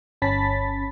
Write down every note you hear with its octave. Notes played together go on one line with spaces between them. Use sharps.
G1 C#4 A5 B5 A6 B6